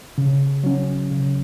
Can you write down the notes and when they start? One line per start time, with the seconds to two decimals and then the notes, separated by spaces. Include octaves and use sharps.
0.18 C#3
0.63 F#3 C#4
1.10 C#3